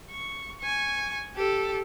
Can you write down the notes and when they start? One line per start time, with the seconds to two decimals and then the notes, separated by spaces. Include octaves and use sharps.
0.11 C#6
0.60 G#5 C#6
1.36 G4 A4